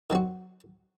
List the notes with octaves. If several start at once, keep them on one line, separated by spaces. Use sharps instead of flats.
D#3 F#3 C4 F#4